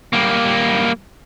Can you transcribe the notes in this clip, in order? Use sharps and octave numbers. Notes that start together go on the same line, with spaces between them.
G3 A#3